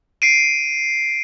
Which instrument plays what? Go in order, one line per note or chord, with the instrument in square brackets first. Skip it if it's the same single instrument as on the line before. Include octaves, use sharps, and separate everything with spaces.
[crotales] C7 D7 D#7